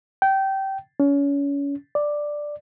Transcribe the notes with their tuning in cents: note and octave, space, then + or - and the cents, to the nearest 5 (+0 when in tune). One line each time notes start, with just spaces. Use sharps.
G5 -20
C#4 +30
D5 +5